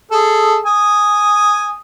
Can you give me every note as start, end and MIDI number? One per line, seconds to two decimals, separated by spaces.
0.11 0.59 68
0.11 0.59 69
0.66 1.79 80
0.66 1.79 87